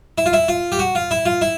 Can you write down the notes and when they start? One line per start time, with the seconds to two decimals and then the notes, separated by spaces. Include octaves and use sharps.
0.18 E4
0.26 F4
0.33 E4
0.48 F4
0.72 G4
0.79 F#4
0.95 F4
1.11 E4
1.26 F4
1.41 E4